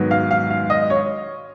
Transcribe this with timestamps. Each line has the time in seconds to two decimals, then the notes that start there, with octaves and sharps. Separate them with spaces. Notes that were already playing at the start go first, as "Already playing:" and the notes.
Already playing: G#2 D#3 F#3 B3
0.11 F5
0.31 F5
0.50 F5
0.70 D#5
0.90 C#5